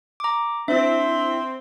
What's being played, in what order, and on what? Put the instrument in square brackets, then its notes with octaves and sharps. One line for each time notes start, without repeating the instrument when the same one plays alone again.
[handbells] A#5 D6
[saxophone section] C4 [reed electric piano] D4 E4 [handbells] E5